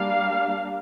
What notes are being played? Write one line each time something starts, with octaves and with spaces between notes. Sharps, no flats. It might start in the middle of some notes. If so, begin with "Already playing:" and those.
Already playing: G3 A#3 D4 F5